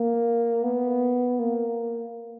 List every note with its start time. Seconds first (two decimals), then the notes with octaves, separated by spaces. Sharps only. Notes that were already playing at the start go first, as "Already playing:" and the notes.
Already playing: A#3
0.63 B3
1.39 A#3